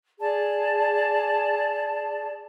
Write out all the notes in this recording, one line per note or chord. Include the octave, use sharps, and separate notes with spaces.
G#4 D5 A5